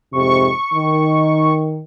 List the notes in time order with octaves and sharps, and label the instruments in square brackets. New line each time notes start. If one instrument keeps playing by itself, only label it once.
[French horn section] F2 G#2 C3 [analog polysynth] C#6
[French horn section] D#3